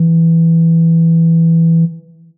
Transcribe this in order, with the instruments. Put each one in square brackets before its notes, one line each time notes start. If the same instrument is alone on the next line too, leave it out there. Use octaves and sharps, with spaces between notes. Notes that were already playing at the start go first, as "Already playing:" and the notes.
Already playing: [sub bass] E3